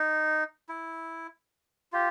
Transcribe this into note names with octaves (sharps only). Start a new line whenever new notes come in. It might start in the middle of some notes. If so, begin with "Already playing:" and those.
Already playing: D#4
E4
F4 G4